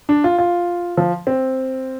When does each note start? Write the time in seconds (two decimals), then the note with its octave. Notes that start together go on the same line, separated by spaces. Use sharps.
0.09 D4
0.24 F4
0.38 F4
0.97 F3
1.27 C4